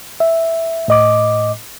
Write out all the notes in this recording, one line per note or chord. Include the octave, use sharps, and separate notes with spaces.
E5
A2 D#5 D6